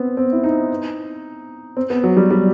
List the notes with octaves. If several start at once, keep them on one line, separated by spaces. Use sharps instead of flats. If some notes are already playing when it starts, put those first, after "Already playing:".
Already playing: B3 C4
C4
E4
D#4
C4
B3
F#3
G3
G3